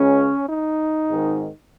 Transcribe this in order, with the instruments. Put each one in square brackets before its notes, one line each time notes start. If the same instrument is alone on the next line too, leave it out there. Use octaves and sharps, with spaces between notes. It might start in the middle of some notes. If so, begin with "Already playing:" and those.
Already playing: [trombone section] C#2 C#3 C#4
D#4
G#1 G#2 D#3